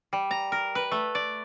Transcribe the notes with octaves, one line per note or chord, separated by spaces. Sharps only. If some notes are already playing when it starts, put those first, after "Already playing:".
G3
A#5
A#4
B4
A3
D5